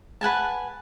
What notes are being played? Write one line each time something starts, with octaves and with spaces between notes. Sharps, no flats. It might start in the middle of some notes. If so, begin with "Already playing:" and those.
B4 F#5 G#5 A5